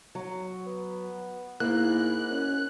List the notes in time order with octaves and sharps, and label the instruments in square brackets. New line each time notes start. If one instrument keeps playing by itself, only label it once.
[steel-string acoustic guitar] F#3
[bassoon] B3
[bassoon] G#2 [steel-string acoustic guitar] A#3 [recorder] E4 [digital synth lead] F#6
[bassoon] F#2 [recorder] C#4